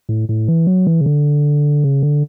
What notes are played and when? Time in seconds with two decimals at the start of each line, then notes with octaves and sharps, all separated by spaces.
0.09 A2
0.29 A2
0.48 E3
0.67 F#3
0.87 E3
1.01 C#3
1.06 D3
1.84 C#3
2.03 D3